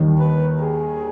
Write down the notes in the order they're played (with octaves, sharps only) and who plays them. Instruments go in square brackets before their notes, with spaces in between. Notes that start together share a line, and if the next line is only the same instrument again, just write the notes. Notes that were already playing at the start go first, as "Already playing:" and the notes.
Already playing: [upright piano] D#2 D#3 G3
[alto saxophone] B4
G#4